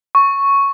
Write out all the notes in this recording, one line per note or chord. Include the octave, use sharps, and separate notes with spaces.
C#6